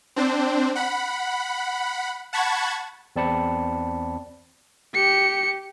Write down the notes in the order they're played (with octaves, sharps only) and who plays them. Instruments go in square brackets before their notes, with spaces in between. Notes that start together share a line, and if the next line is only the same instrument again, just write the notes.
[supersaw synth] C4 D4 C5
F#5 B5
F#5 A5 B5 C#6 G#6
[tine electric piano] E2 C4 D5 A5 B5 C#7
[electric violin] G4 C#7